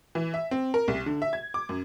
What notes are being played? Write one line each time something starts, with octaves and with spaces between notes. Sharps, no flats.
E3
E5
C4
A#4
C2
D3
E5
G#6
D6
F#2